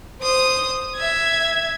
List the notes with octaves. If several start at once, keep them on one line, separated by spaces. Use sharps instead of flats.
C5 D#6
E5 G#6